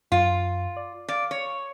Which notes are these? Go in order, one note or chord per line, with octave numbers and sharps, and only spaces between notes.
F#2 F4
D5
D5 F5
C#5